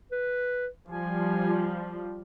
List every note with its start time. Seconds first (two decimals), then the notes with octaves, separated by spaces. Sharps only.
0.12 B4
0.90 F3 G3 G#5